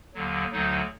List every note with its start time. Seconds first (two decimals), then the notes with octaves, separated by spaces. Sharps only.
0.14 D#2 D3 F#3
0.52 D2 D3 F#3 D#4